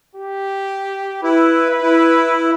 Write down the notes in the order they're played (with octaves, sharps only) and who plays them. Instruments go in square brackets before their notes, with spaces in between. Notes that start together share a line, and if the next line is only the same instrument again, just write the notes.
[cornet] G4
[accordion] E4 [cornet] B4
[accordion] E4